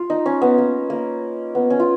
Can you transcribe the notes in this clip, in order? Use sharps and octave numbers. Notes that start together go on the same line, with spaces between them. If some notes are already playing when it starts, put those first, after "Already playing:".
Already playing: F4
D#4
C#4
B3
A#3
A#3
B3
C#4
F4